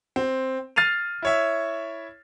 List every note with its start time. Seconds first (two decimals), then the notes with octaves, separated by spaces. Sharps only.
0.16 C4
0.76 F6 A6 C7 D#7 F7
1.22 E4 C#5 E5